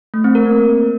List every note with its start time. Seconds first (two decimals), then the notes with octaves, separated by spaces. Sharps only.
0.14 A3
0.24 C4
0.35 A#4
0.46 A#3